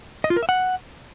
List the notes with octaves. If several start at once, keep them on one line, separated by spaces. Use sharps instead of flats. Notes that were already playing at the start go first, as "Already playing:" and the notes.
D#5
F4
A#4
E5
F#5